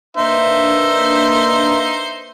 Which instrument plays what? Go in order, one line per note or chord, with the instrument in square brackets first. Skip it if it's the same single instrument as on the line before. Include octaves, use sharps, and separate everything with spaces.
[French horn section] A#3 D4 B4 [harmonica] D#4 C5 [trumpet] E5